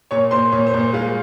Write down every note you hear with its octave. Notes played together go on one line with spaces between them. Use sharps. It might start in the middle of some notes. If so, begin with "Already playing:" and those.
A#2 C#5 C#6
A#2 C5 C6
A#2 C#5
C5
A#2
C5
G#3 F4 F5